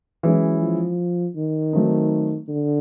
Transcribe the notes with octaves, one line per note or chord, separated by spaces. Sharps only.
E3 F#3 G#3 C#4 E4
F3
D#3
F#3 A3 C4 D#4
D3